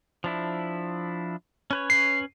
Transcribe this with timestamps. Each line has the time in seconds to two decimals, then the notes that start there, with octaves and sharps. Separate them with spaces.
0.24 F3 D4 E4
1.71 C#4 B4 C#5
1.90 C7